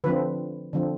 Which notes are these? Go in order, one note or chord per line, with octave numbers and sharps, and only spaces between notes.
D3 F3 C4 B4
D3 F3 C4